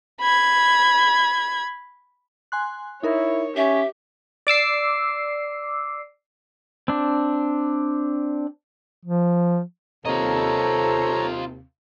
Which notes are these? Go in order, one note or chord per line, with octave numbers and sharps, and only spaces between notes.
B5 G#6
G#5 C6 F#6
D#4 E4 A#4 C#5
C#4 G4 E5
D5 D6 E6 C7
C4 D4
F3
D#2 C3 F4 A4 C#5 D#5 A#5